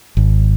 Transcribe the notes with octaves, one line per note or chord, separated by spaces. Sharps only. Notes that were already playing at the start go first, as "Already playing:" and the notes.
G#1